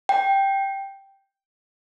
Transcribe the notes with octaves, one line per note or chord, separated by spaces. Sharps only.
G5